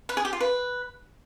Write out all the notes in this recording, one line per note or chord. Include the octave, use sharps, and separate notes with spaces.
B4
G#4
G4
F4
B4